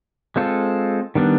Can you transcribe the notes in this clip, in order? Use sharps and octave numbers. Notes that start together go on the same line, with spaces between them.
G#3 C4 F4 A4
D#3 G3 B3 D4